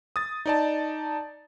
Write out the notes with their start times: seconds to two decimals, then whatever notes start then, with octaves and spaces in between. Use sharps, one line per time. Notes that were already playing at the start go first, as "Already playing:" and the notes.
0.16 D#6 A6
0.46 D#4 D5 A5